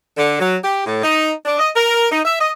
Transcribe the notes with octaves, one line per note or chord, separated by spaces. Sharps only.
D3
F#3
G4
A2
D#4
D4
D#5
A#4
D#4
E5
D#5